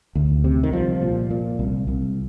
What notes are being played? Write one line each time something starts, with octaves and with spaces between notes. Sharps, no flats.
D2
C3
D#3
C2 F3
A#2
A#2
C2
C2